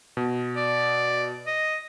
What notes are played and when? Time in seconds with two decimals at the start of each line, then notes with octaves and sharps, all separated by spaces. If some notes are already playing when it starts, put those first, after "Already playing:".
0.17 B2
0.56 D5
1.47 D#5